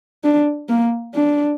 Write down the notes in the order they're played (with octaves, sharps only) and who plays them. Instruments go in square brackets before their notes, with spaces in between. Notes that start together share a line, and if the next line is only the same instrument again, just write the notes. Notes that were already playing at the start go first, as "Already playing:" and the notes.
[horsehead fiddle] D4
A#3
D4